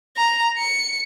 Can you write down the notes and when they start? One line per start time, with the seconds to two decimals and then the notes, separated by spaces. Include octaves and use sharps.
0.17 A#5
0.59 C#7